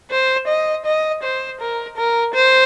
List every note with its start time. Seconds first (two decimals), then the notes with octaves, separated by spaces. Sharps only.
0.11 C5
0.48 D#5
0.85 D#5
1.23 C5
1.61 A#4
1.97 A#4
2.34 C5